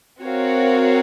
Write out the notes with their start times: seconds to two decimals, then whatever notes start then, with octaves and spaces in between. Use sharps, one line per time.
0.22 C4 F#4 A#4 C#5 F5